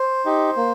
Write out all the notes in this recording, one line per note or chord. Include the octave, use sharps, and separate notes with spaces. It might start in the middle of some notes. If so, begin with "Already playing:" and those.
Already playing: C5
D#4 G4
A#3